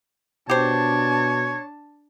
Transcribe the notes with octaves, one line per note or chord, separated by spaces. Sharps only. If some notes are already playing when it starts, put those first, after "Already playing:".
B2 D4 G4 C5 C#5 A5